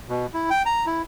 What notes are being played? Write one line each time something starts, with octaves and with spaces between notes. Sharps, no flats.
B2
E4
G5
A#5
E4